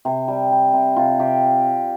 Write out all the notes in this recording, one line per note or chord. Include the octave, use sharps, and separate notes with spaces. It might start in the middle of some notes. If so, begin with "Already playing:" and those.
C3
G3
G3
C3
C3 F4
C3 G4